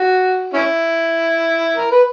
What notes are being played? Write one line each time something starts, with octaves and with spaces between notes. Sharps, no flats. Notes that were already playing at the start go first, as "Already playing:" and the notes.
Already playing: F#4
C#4 E4
A#4
B4